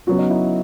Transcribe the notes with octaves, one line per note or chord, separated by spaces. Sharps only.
C#3 F#3 B3 F#4
D#4
E4